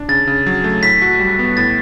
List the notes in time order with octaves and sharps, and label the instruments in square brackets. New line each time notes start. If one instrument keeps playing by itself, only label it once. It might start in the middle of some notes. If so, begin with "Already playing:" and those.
Already playing: [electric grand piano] D4
[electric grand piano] C#3 [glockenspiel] A6
[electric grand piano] C#3
F#3
A3
[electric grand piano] A2 [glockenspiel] B6
[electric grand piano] F#4
G3
B3
[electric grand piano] A2 [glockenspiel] A6